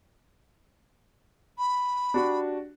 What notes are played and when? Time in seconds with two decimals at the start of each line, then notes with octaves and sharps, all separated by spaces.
1.58 B5
2.14 D4 F#4 G4